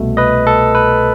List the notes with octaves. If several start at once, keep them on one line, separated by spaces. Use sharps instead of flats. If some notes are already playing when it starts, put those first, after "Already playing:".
Already playing: C2 B2 A3
B4 D#5
A4
B4